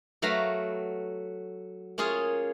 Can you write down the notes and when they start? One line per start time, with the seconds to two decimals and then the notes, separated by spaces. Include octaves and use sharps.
0.22 F#3 A3 B4 F5 A#5 B5
1.98 A#3 C#4 F4 G#4 C#5